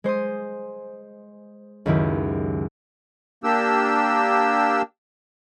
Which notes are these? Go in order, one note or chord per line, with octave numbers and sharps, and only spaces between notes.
G#3 C5 C6 D#6
C#2 F#2 D#3 E4 G4
A#3 D4 G4 E6